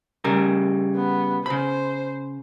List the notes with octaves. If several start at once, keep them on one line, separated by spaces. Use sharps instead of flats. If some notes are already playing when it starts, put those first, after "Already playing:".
C#3 G3 A#4
B3
C#3 C5 B5